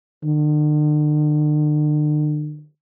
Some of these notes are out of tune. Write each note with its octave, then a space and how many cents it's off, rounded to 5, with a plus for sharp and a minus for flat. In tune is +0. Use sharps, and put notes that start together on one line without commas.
D3 +40